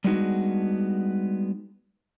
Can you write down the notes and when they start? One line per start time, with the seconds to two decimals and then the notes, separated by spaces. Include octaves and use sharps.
0.04 G3 G#3 B3 D4 D#4 F#4